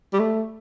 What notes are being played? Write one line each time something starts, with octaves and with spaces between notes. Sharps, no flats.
G3
A3